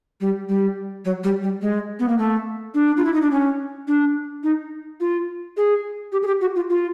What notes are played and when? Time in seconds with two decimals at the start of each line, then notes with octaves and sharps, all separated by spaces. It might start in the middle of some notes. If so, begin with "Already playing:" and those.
0.21 G3
0.49 G3
1.05 F#3
1.24 G3
1.43 G3
1.62 G#3
1.99 B3
2.08 A#3
2.18 A3
2.74 D4
2.97 F4
3.05 E4
3.14 D#4
3.22 D4
3.31 C#4
3.88 D4
4.44 D#4
5.00 F4
5.57 G#4
6.12 G4
6.23 G#4
6.27 G4
6.41 F#4
6.56 F4
6.70 F4